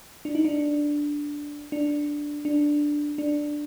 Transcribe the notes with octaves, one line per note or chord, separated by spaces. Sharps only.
D4
D#4
D4
D4
D4
D4